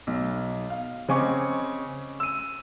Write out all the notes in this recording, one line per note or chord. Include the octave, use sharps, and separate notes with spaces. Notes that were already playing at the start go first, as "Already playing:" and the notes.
B1
F5
C#3 C4 D#5 G#5 C#6 D6
E6 D#7